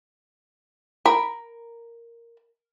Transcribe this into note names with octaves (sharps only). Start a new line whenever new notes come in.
A#4 B5